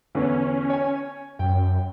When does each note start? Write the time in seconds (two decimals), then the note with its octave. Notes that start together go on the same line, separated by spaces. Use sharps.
0.15 E2 D3 B3 C#4
0.70 C#5 G#5
1.39 F#2 G5